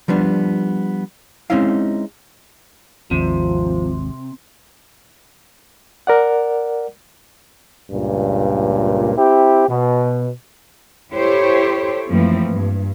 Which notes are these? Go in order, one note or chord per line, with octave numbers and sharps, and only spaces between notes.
F3 G3 B3 D4
G#3 C4 C#4 D#4 E4 F5
G#1 D#2 C3 F3
A#4 D5 F#5
C#2 G2 A#2
C4 E4 G4
B2
E4 G4 A4 C5 C#5
F#2 E3 F3 A3 A#3 C4
G2